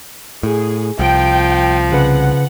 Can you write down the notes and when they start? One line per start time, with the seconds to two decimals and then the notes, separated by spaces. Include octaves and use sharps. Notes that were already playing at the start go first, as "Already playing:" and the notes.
0.43 A2 G#4
0.99 C2 F3 G5
1.92 C#3 B4 F#5